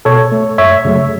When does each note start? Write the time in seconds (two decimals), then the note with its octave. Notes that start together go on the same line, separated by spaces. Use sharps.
0.05 B2 A4 C#5
0.32 A3
0.58 F#2 C#5 E5
0.85 C#3 F#3 A3